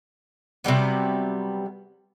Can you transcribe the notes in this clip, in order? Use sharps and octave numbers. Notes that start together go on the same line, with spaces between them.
C3 F#3 G3 B3